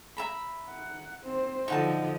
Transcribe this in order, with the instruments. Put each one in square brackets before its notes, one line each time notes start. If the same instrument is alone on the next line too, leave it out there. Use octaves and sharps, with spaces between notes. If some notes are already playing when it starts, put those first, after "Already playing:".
[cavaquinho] E5 A#5 B5
[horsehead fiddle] F#5
C4 C5
[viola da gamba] D3 F3 [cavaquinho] D#4 F#4 A5 [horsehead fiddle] D#5